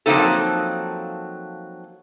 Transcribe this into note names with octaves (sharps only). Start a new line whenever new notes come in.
F3 F#3 A#3 C4 D#4 A4